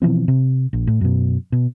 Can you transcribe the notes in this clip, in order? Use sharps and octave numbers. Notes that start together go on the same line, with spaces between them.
B2 E3 F3 C4
C3
A#1
A2
F#2 B2
B2